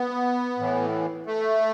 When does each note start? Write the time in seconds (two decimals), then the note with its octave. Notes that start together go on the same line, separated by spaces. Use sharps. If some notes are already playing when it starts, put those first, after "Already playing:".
Already playing: B3
0.59 A2 E3
1.26 A3